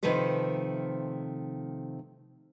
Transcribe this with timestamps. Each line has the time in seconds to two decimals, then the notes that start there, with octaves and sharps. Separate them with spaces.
0.03 C3 D#3 F3 A3 B4 C5